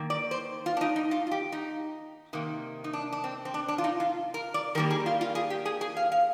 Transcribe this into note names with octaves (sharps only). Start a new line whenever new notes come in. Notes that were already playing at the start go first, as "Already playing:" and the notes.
Already playing: D#3 A#3
D5
C5
F4
D4
D#4
D#4
F4
F4
G4
D#4
C3 D#3 A#3
D#4
D4
D4
C4
C4
D4
D4
F4
D#4
F4
A#4
D5
D#3 G3 A#3 A#4
G#4
F4
F4
G#4
G4
G#4
G#4
F5
F5